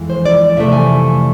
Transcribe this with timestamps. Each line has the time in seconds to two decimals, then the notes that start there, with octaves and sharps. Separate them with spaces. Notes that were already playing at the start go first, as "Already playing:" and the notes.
Already playing: F2 E3 G#3
0.10 C5
0.25 D5
0.57 F2 C3 E3 A3 E5
0.73 G#5